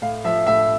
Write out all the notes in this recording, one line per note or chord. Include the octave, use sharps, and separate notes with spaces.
A2 F5
F3 E5
A2 E5